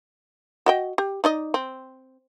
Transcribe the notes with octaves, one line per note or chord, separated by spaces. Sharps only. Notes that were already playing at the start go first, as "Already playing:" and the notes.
F#4 D#5 G5
G4
D#4 D5 D#5
C4